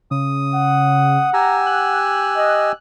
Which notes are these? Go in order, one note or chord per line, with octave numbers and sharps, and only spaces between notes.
C#3 D#6
F#5
G4 G#5 A#5 E6
F#6
D#5